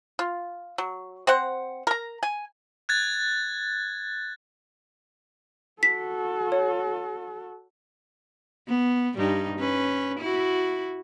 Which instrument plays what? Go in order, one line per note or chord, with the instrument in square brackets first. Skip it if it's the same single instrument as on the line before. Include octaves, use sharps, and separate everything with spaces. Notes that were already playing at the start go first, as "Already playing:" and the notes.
[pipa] F4
F#3
C4 C5 F#5
A#4 A#5
G#5
[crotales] F#6 G#6 A6
[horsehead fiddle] F#4 A4 [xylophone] B6
[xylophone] C#5
[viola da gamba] B3
G2 G3 D#4
C#4 B4
E4 F#4